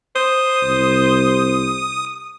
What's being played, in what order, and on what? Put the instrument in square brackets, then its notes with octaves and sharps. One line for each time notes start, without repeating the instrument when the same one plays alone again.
[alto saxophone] C5 [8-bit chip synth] D#6
[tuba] C2